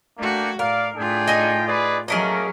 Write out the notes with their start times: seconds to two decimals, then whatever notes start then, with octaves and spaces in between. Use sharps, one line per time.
0.18 A3 A#3 D4 F#4 G5
0.59 A2 A#4 D5 F5
0.96 A2 D4 F4 G#4 G5
1.27 D#4 D#5 G#5
1.68 G#4 B4 D5
2.08 F#3 A3 A#3 C#4 G#4 A#4 D#5